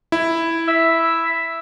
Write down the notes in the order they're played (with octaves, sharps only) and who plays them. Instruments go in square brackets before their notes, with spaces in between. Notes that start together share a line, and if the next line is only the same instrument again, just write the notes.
[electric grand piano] E4
[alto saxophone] E5